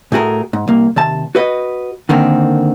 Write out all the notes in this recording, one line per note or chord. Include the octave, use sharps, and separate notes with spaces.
A2 A3 F#4 G#4 A#4
G#2
C2 A#3
D#2 C3 A5
F#4 B4 D#5
D3 D#3 A#3 C4